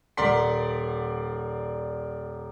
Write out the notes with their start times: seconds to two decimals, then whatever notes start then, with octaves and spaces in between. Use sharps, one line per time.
0.17 D#1 A#4 D5 F#5 C6 B6